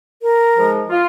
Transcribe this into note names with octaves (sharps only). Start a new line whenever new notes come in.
A#4
G#2 F3 G#3
F4